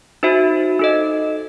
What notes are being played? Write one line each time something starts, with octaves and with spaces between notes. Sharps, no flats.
D#4 F#4 C5 E5
D#4 A4 D#5